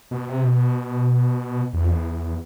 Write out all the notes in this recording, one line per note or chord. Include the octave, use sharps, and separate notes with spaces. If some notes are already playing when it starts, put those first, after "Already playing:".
B2
C3
B2
E2
F2
E2